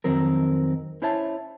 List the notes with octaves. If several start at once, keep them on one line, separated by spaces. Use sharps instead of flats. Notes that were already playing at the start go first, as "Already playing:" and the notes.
F2 D#3 F#3 C4 A#4
C#4 E4 C5 C#5 E5 A5